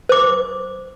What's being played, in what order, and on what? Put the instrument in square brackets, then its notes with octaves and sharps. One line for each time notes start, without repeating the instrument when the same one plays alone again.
[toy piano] C5 D6